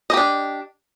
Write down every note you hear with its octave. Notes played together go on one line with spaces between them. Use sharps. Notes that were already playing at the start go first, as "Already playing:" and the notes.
D4 G4 D#5